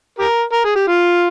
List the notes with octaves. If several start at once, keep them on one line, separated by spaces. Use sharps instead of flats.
G4 A#4
A#4
G#4
G4
F4